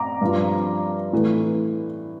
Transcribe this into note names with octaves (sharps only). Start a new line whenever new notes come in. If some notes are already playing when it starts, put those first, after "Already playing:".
Already playing: A#5 D6
G2 F3
A2 E3